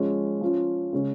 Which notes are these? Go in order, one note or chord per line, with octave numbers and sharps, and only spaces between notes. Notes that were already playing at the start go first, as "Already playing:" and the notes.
Already playing: F3 G#3 C#4
F3 C#4 F4
C#3 G#3 C#4